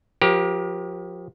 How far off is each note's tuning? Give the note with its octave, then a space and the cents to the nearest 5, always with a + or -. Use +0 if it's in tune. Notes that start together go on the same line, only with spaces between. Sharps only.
F3 +30 G4 +0 A#4 +40